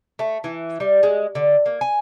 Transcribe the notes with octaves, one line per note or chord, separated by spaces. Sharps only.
A3
E3
G3
G#3
D3
A#3
G#5